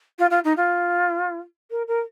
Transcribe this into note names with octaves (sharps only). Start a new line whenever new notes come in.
F4
F4
D#4
F4
A#4
A#4